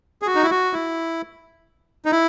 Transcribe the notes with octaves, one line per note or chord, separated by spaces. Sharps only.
G#4
F#4
D#4
E4
F#4
E4
D#4
E4